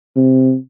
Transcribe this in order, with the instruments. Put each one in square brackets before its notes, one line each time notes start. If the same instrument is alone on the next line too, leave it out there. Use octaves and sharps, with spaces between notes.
[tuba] C3